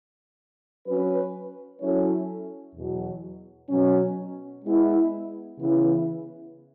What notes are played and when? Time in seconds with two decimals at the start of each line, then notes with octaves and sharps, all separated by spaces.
0.86 F#3 C#4 F#4 B4
1.80 F#3 C#4 E4 A4 C#5
2.75 E2 B2 F#3
3.69 B2 F#3 C#4
4.64 G#3 B3 E4
5.58 C#3 E3 B3 E4